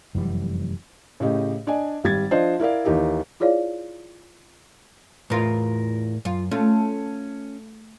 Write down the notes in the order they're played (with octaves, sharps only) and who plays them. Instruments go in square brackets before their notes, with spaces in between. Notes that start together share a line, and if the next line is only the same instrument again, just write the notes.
[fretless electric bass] F1 F#2 E3 G3
[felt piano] A2 C#3 G4 D#5
D4 D5 D#5 G#5
G#1 G3 G#6 A6
F3 D4 F4 C5 D5 D#5
E4 A#4 D5 F5
D#2 E3 D#4 G4 A#4
[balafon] E4 F4 G#4 C#5 D5 F5
[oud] E2 F4 [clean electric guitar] A2 A#4
[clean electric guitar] F#2 [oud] F4
[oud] A3 F4 [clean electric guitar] C#4